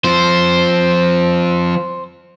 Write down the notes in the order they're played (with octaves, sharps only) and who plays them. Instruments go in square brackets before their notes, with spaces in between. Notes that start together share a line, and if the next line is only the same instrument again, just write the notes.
[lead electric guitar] F3 C4 [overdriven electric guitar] C5